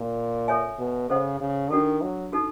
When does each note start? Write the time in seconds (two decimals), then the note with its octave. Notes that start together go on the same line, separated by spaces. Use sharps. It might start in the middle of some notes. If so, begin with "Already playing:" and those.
Already playing: A#2
0.48 A4 C#5 E5 G#5
0.79 B2
1.10 C#3 A4 C5 D#5 F#5
1.41 C#3
1.70 D#3 D4 F#4 A4
2.02 F#3
2.32 D#4 F#4 A4